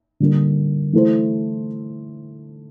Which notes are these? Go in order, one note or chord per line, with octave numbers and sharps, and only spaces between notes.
D3 G3 A#3
E3 A3 E4 A4 C5